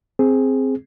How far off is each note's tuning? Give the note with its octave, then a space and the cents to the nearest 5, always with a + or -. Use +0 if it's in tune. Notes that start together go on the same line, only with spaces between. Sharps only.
C4 +0 G#4 +0